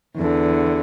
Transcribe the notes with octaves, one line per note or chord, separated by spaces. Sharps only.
E2 D3